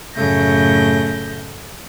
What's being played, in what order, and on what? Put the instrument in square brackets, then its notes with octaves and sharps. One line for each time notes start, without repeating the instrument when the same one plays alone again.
[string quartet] F#2 A2 C#3 A3 G6 A#6